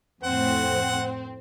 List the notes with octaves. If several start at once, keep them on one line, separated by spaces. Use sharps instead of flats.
F2 A2 C4 F#5